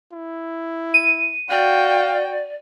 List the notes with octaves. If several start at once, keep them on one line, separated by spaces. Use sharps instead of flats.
E4
D#7
F#4 D5 F5 G5